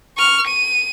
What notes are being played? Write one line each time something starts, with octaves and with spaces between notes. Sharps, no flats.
C#6 F6
D#7